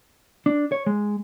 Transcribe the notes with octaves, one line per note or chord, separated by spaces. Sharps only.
D4
C#5
G#3